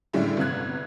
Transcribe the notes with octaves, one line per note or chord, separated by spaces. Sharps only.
A2 D3 G3 G#3 C#4 E4
G1 C3 B3 F#6 G#6